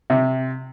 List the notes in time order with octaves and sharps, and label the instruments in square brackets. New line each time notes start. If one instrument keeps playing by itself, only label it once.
[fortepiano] C3